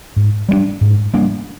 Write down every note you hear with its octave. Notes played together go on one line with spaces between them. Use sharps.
G#2
G3 A#3 D4
G#2
G3 A#3 D4